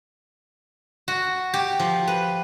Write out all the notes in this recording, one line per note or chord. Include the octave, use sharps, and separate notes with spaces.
F#4
G4
F3
B4